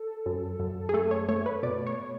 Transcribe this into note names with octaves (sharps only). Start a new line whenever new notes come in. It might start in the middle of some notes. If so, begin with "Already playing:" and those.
Already playing: A4
F#2
F#2
G#4
A3 A4
C#5
A3 C#5
B4
B2 D5
C#5